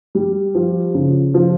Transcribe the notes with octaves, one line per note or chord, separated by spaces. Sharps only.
G3
F3
C#3
F3